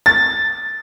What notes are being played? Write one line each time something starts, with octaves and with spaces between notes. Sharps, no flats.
A6